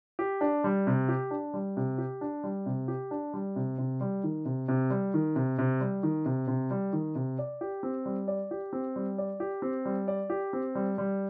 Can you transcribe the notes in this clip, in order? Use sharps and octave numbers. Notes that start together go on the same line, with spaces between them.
G4
D4
G3
C3
G4
D4
G3
C3
G4
D4
G3
C3
G4
D4
G3
C3
C3
G3
D#3
C3
C3
G3
D#3
C3
C3
G3
D#3
C3
C3
G3
D#3
C3
D5
G4
C4
G3
D5
G4
C4
G3
D5
G4
C4
G3
D5
G4
C4
G3
G3